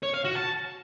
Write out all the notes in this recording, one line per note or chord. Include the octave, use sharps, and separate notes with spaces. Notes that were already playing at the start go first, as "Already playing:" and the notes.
C#5
F5
F#4
A5